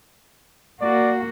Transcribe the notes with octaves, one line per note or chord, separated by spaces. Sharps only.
A#3 F#4 D5